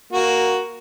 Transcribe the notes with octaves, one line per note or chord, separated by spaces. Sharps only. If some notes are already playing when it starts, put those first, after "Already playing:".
A#3 F#4